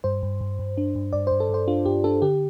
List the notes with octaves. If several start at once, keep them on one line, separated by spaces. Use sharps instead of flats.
G2 C5
G2
G2
G2
D4
G2
G2 D5
G2 C5
A4
G2 C5
D4 F4
G2 G4
D4 A4
D3 G4